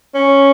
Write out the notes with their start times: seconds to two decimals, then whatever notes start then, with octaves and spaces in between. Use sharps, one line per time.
0.14 C#4